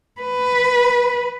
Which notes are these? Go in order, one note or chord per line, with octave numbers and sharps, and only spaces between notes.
B4